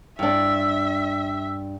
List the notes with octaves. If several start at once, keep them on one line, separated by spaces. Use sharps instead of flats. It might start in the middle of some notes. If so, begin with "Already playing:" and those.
G2 D4 E5